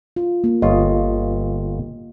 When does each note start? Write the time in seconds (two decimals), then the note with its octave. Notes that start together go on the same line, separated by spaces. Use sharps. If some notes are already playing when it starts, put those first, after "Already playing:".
0.16 F4
0.44 A#3
0.62 G1 F4 C#5 D#5